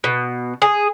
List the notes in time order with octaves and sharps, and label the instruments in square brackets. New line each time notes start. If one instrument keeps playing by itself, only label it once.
[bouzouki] B2
G#4